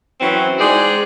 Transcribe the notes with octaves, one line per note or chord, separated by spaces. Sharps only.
E3 F#3 C4 C#4 E4
G#3 D#4 G#4 C5 D5